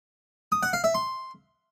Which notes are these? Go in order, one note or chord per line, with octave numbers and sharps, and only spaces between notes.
D#6
F#5
F5
E5
C6